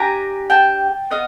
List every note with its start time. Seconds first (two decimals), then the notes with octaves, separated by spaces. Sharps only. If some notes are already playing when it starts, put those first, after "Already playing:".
Already playing: D4 G4 G#5 A#5
0.50 G5 A5
1.11 B3 D#5 F5